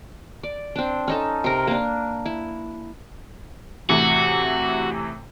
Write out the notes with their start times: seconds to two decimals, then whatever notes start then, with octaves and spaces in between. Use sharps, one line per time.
0.43 D5
0.76 C4 D4
1.08 C#4 D#4 A4
1.44 C3 A#4
1.67 A#3 D4
2.26 E4
3.89 A2 C3 E3 F#4